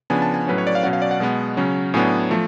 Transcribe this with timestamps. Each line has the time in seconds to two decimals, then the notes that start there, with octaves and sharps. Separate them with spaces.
0.10 C#3 F3 B3 D4 G#5
0.22 A5
0.34 G#5
0.47 A2 F#3 C#4 B4
0.58 C#5
0.67 D5
0.75 F5
0.83 B2 F#3 C#4 F#5
0.93 F5
1.02 D5
1.11 F#5
1.20 B2 G#3 B3
1.57 C#3 F#3 C#4
1.94 A2 F#3 B3 D4 G#5
2.31 F3 A3